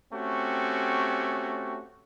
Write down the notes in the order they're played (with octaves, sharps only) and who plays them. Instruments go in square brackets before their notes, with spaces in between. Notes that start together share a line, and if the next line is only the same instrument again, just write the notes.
[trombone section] A3 C4 C#4 F#4 G4